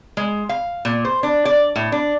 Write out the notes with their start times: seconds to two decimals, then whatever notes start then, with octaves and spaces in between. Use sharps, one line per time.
0.17 G#3
0.49 F5
0.85 A#2
1.05 C5
1.23 D4
1.45 D5
1.76 A2
1.92 D4